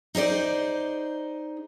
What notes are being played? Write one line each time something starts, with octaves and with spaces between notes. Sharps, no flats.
D#4 G#4 C5 D5